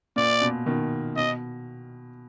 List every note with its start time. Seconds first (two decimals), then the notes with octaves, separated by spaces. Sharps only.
0.16 A#2 D5
0.41 B2
0.66 B2 D#3
1.16 B2 D#5